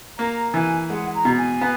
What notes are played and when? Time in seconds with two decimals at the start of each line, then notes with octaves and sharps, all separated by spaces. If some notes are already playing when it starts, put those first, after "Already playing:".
0.18 A#3 A#5
0.54 E3 G#5
0.90 G#3 F#5
1.14 A#5
1.25 B2
1.38 G#5
1.61 B3